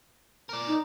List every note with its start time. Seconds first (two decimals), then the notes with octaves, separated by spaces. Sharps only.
0.49 A#4 D5
0.67 D#4